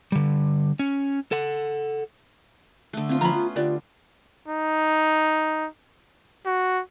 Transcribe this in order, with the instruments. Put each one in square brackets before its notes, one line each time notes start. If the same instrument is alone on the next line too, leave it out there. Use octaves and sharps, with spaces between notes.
[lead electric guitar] D3 G3
C#4
A4 F#5
[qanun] D3 A3
[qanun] B3 F4 [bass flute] C4
[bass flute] F3 [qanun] B3 C#4 [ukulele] A#5 B5
[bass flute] F4
[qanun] D3 [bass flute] F4 [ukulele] G4 B4 D5
[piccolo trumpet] D#4
F#4